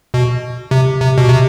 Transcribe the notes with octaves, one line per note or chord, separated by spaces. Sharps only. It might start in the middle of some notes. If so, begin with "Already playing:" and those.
B2
C3
C3
B2
C3